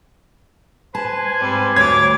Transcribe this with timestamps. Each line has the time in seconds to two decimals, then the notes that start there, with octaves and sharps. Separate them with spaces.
0.95 B4 C5 G#5 A5
1.40 G#2 G3 C4
1.76 D2 C#5 D6 G#6 A6